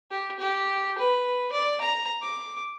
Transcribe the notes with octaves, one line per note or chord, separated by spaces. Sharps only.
G4
G4
B4
D5
A#5
D6